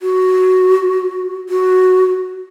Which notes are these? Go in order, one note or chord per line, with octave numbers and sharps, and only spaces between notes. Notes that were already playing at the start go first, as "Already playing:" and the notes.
F#4
F#4